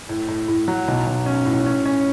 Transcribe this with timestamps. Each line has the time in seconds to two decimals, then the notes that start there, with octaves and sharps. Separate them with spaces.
0.09 A2
0.28 A2
0.48 A2
0.68 F#3
0.88 B1
1.07 B1
1.26 C#4
1.46 A2
1.66 C#4
1.86 C#4